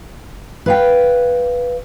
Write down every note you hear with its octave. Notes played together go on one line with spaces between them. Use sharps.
B4 F5 G5